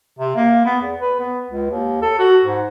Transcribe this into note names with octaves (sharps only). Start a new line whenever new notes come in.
C3
A#3
B3
E2
B4
B3
C#2
D#2
A4
F#4
G#2